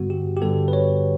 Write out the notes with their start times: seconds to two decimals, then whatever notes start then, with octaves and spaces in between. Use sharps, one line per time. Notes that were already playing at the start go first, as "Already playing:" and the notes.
Already playing: G2 D3 G3 B3 F#4
0.10 G4
0.37 G4
0.41 G2 D3 G3 B3 A4
0.68 B4
0.73 C#5